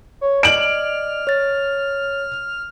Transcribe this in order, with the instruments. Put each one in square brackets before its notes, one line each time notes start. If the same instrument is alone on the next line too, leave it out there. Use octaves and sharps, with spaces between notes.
[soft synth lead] C#5
[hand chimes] D5 D#5 [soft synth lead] F6 [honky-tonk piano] D7 F#7
[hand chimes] C#5 A6